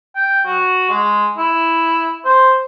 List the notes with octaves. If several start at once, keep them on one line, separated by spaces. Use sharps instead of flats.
G5
F#4
G#3
E4
C5